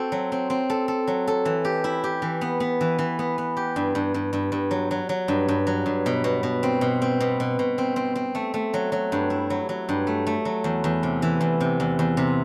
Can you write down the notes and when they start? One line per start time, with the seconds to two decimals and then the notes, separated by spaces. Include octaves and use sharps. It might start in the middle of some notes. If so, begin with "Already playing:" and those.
Already playing: C4 F#4 A4
0.12 F#3
0.32 C4
0.50 C4
0.70 A4
0.88 A4
1.07 F#3
1.28 A4
1.45 E3
1.65 G4
1.84 E4
2.04 G4
2.22 E3
2.41 B3
2.60 B3
2.81 E3
2.99 E3
3.19 B3
3.38 B3
3.57 G4
3.76 G2
3.95 G2
4.14 G2
4.33 G2
4.52 G2
4.71 F#3
4.91 F#3
5.09 F#3
5.28 G2
5.48 G2
5.67 F#3
5.86 G2
6.06 B2
6.24 B2
6.43 B2
6.63 C4
6.81 B2
7.02 C4
7.20 B2
7.40 B2
7.59 B2
7.78 C4
7.96 C4
8.15 C4
8.35 A3
8.54 A3
8.74 F#3
8.92 F#3
9.12 G2
9.30 E4
9.50 F#3
9.69 F#3
9.89 G2
10.07 A3
10.27 A3
10.45 F#3
10.64 E2
10.84 E2
11.03 C3
11.22 E3
11.41 E2
11.60 C3
11.80 E2
11.99 E2
12.17 C3